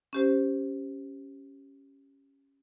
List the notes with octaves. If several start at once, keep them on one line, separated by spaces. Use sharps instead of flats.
C#4 G4 C5